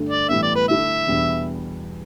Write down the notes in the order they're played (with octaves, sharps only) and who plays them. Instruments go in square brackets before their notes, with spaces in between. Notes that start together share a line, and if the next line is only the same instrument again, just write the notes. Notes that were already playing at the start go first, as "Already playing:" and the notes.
Already playing: [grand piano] G2 D3 A3 D4
[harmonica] D5
[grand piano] A2 E3 G3 B3 [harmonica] E5
[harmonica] D5
B4
[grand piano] D3 A3 E4 A4 [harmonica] E5
[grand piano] E2 B2 G3 B3 D4